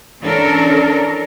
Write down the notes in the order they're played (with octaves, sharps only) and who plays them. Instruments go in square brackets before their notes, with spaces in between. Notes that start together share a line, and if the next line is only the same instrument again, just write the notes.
[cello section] E3 C#4 D4 A4 A#4